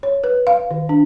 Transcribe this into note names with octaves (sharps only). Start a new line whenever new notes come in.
C#5
B4
F5
D#3
D4